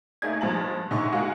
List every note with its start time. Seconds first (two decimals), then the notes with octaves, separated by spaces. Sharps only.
0.22 A3 A#3 D#4 G#4 D5 G#6
0.41 G2 F3 G#3 A5 F#7
0.90 A2 D3 D#4 G#4 C6 C#6
1.12 G#3 A#3 F4 F#4 G#4